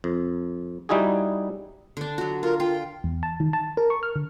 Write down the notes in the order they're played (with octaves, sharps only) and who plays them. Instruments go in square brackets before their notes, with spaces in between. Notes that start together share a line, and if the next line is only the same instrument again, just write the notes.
[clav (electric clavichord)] F2
G3 D#4 E4 F#4 G#4
[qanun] D3 D4
F#3 F#4
[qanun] F4 [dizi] A#4
[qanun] F4 [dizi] G5
[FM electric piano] E2
A5
D#3
A5
A#4
C#6
F6
D3